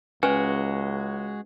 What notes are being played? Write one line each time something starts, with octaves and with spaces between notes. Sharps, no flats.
C#2 G#3 C#4 F#4 B4 G#5